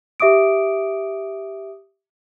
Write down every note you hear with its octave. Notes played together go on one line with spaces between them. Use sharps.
G4 E5 D6 D#6 D7